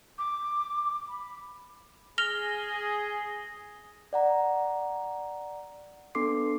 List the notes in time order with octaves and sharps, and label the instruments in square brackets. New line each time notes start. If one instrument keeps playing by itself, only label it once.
[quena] D6
B5
[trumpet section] G#4 [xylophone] F6 F7 [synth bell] A#6 G7
[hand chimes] D5 F#5 A#5
B3 D4 A4 C6 D6 C7